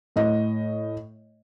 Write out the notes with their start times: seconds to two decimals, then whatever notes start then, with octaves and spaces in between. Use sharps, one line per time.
0.16 A2 D#5